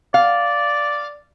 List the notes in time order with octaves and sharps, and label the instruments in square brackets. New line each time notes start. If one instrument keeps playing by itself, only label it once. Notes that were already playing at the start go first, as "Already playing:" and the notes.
[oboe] D5 [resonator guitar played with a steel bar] F5